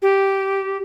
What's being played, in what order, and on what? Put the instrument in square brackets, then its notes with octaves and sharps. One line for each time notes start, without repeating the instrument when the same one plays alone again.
[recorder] G4